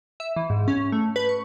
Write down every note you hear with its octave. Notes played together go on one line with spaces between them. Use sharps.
E5
E3
G#2
C#4
A3
B4
C#6